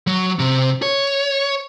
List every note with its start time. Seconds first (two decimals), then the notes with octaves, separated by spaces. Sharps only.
0.07 F#3
0.39 C3
0.82 C#5